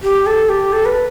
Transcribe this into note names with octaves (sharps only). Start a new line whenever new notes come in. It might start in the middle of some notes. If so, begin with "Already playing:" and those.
G4
A4
G4
A4
B4